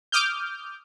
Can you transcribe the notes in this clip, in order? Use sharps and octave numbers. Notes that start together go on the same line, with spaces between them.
D6 D#6 F6 G6